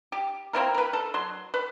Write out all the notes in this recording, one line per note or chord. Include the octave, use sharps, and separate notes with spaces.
G4
A#3 C4 E4 A#4
A#4 B4
A4
F#3 C6
B4